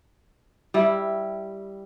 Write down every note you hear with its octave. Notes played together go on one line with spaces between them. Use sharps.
G3 E4